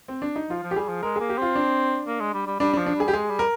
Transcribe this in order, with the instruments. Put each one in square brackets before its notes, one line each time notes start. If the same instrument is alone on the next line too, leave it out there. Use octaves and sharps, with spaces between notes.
[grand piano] C4
D4
D#4
[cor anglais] F3 [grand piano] F4
[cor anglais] F3
[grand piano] G4
[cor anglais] G3 [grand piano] G#4
[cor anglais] F3
[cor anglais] G#3 [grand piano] A#4
[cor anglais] A#3 [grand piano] G#4
[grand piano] G4
[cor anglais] C4 [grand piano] F4
[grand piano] D4
[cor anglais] A#3
G#3
G3
G3
[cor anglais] G3 [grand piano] D4
[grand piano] D4
[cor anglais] F3
[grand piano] D4
[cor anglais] G3 [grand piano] G#4
[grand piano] G4
[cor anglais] G#3 [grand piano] G#4
[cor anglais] G3
[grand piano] A#4